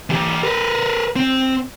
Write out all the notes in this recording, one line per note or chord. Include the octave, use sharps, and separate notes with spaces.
E3 G4
A#4 B4
C4